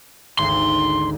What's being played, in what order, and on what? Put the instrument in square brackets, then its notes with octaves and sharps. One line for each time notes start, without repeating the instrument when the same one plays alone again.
[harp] G#1 D2 [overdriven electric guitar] C6